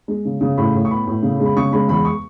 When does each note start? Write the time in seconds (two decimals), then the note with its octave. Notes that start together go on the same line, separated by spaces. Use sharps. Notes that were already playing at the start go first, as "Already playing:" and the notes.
0.08 G#3
0.25 C#3
0.41 C#3
0.58 A2 B5
0.74 A2
0.85 C#6
0.91 B3 B5
1.07 A2
1.23 C#3
1.40 G#3
1.46 B5
1.56 C#3 C#6
1.73 G#3 B5
1.88 E2 B5
2.05 C#6